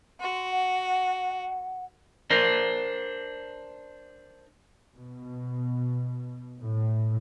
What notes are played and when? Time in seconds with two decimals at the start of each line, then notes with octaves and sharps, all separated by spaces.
0.21 F#4 C6
0.51 F#5
2.30 D4 A#4 C5
4.95 B2
6.61 A2